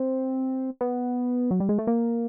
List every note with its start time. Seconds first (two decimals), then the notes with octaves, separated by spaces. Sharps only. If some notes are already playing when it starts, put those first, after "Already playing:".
Already playing: C4
0.81 B3
1.51 F#3
1.60 G3
1.69 G#3
1.78 A3
1.87 A#3